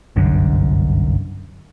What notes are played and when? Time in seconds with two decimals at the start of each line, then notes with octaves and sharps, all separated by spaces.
0.16 G1 C2 F#2 D3